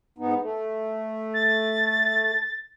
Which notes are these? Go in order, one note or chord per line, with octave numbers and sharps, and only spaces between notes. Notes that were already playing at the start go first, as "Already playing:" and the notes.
G#2 B3 D#4
A3
A6